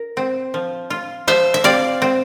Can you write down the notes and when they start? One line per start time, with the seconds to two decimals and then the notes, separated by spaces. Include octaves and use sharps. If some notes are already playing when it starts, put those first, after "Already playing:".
Already playing: A#4
0.17 C4
0.54 F3
0.90 F4
1.27 F3 C5 E5
1.54 E5
1.64 C4 D5 F5
2.02 C4